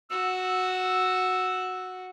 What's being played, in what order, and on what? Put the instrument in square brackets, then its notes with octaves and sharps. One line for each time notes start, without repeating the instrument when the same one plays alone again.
[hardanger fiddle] F#4 [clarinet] E6